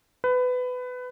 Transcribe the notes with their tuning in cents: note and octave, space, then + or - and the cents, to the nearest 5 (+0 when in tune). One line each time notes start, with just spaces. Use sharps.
B4 +20